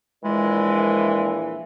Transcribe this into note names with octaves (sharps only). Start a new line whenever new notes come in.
A#1 A#2 E3 G#3